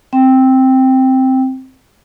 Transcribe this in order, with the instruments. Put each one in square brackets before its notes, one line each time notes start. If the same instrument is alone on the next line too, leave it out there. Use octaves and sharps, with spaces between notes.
[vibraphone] C4 G5